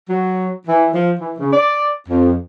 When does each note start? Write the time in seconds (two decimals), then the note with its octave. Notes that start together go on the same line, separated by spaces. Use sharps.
0.09 F#3
0.67 E3
0.94 F3
1.19 E3
1.39 C#3
1.52 D5
2.09 F2